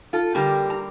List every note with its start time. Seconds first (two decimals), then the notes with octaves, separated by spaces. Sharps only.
0.13 F4 A4
0.35 D3 G3 A#3 G4 A#4
0.70 A#5